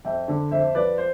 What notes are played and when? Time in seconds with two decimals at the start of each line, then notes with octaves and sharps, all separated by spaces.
0.05 F2 E5 G5
0.28 D3
0.51 F2 C5 E5
0.75 F3 B4 D5
0.98 C5